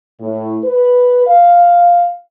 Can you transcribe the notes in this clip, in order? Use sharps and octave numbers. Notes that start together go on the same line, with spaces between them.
A2
B4
F5